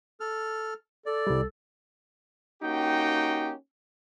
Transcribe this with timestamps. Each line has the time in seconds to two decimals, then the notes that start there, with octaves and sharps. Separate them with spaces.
0.20 A4 F6
1.06 A4 D5
1.27 C2 G3
2.62 A#3 C#4 D#4 F#4 G4 G5